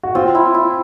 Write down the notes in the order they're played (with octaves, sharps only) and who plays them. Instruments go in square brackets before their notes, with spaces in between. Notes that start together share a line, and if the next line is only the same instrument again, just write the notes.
[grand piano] F#4
[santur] C4 [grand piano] F4
[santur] E4
E4